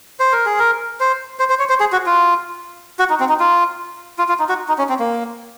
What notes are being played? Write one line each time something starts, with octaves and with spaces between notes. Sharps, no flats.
C5
A#4
G#4
A#4
C5
C5
C5
C#5
C5
G#4
F#4
F4
F#4
D#4
C4
D#4
F4
F4
F4
D#4
F#4
D#4
C#4
C4
A#3